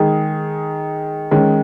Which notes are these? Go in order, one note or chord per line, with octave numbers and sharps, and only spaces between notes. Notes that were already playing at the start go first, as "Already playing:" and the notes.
Already playing: D#3 G#3 D#4 G#4
D#3 G#3 C#4